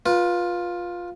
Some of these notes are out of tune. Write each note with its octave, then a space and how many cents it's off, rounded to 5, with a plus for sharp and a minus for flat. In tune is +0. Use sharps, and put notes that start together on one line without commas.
F4 +10 B4 -25